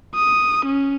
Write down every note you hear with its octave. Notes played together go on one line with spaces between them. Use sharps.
D#6
C#4